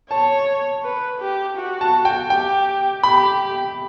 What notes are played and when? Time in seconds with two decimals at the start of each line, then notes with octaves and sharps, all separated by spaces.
0.11 C#5 A5
0.84 B4
1.20 G4
1.57 F#4
1.81 A5
2.05 G5
2.30 G4 G5
3.03 G4 B5